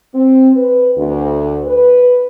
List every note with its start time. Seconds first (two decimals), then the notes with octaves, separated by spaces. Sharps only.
0.14 C4
0.56 B4
0.98 D2
1.67 B4